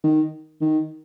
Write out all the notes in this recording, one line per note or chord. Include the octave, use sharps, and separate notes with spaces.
D#3
D#3